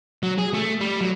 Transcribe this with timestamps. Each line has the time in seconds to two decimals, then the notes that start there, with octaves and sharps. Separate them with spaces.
0.23 F#3
0.38 G#4
0.53 A3
0.80 G3
1.01 F#3